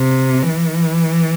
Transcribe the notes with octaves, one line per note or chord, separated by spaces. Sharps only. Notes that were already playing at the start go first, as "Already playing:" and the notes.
Already playing: C3
E3